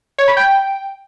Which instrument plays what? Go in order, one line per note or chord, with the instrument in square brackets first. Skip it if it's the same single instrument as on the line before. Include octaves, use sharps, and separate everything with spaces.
[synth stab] C#5
B5
G5